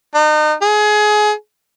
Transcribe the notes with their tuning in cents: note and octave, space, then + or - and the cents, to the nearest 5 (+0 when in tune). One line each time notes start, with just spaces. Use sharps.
D#4 -35
G#4 +25